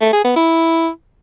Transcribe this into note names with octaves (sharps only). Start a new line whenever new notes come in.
A3
G#4
B3
E4